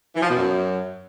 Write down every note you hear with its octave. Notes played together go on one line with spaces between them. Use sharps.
E3
F3
B2
F#2